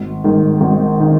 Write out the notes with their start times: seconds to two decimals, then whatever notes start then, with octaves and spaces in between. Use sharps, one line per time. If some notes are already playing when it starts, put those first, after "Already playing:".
Already playing: G#1
0.24 G#2 D#3
0.61 G#1
1.00 D#3